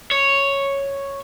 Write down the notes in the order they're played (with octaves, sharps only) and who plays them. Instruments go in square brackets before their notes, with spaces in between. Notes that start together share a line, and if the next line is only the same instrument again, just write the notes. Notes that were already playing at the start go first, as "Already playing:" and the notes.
[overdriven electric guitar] C#5